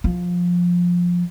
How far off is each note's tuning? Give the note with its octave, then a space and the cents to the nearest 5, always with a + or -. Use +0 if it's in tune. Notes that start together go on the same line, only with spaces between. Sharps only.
F3 +15